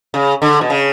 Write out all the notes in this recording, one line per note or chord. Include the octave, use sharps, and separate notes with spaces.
C#3
D3
B2
C#3